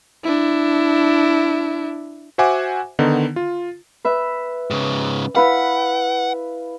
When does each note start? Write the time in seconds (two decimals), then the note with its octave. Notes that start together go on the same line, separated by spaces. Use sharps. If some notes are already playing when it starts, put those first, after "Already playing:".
0.24 D4 E4
2.38 F#4 C5 E5 F#5 G#5 D6
2.99 D3 D#3 B3 D#4
3.36 F4
4.05 B4 E5
4.70 G#2 C#3
5.35 E4 B4 F5 F#5